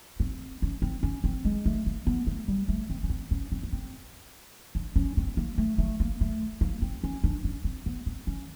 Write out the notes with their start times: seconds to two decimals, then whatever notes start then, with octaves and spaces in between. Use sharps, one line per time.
0.20 C4
0.62 C#4
0.82 C4
1.03 C#4
1.24 C4
1.45 G#3
1.66 A3
1.86 A#3
2.07 B3
2.27 A3
2.48 G3
2.68 A3
2.90 C4
3.03 C#4
3.09 C4
3.31 C#4
3.52 C4
3.63 B3
3.73 C4
4.75 D4
4.96 C#4
5.17 C4
5.37 A#3
5.58 A3
5.78 A3
6.00 A#3
6.21 A3
6.61 A#3
6.82 C4
7.04 C#4
7.24 D4
7.44 C#4
7.64 C4
7.86 B3
8.06 C4
8.27 C#4